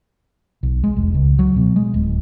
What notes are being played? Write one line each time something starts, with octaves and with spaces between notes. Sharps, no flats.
B1
G#3
E1
C#2
F#3
B2
G#3
D1